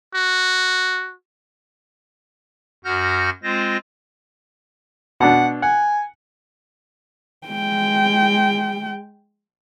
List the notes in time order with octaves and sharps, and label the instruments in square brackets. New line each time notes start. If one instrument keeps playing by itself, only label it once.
[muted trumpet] F#4
[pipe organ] F#2 F#4 F#5 F6 G6 A#6
G#3 C4 F4 C5 A#6
[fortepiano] B2 D4 [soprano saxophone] F#5
[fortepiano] F#5 [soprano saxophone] G#5
[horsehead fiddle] G#3 G5